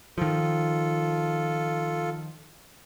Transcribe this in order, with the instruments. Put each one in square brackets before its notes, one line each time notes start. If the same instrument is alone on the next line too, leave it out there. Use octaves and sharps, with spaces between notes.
[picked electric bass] D#3 F3 [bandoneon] F4 A4